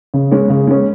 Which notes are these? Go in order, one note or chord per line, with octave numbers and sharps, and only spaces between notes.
C#3
G#3 C#4
C#3
G#3 C#4